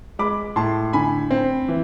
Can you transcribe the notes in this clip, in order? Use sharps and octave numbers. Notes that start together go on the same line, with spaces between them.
G#3 B5 D6
A2 A5 C6
D3 G#5 B5
C4
E3